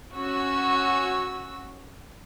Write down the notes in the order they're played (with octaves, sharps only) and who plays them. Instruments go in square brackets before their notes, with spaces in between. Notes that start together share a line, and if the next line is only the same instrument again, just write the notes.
[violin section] C#4 F#4 E6